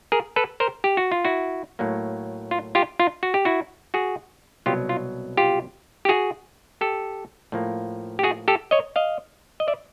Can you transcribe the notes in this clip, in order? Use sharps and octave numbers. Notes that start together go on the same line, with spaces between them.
G#4 A#4
A4 B4
A#4 C5
G4
F#4
F4
E4 F#4
A2 F#3 A#3
F4
F4 G4
F4
F#4
G4
E4 F#4
F#4 G#4
C2 B2 F#3 F4 G4
F4
F4 G4
G4
F#4 G#4
G4 A4
A2 F3 A#3
G4
F#4 G#4
G4 A4
C#5 D#5
D#5 F5
D#5
D5 E5